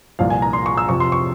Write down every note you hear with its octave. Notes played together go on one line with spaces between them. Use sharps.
C2 A#2 F3 F5
G#5
A#5
C6
C#6
E6
F2 C3 F3 C#6
C6
C#6